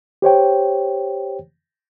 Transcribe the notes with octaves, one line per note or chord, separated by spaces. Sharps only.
G4 C5 C#5 G5